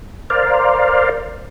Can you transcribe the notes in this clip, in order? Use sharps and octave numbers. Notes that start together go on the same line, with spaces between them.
A#4 C5 D5 F5